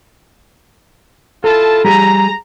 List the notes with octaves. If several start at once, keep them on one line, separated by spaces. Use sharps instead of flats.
E4 F4 A4 A5
G3 G4 G#4 A#5